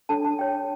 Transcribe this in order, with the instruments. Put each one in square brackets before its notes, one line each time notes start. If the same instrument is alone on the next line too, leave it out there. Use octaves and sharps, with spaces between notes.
[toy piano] D4 A4 C#5 A5
A5
D4 A4 C#5 G5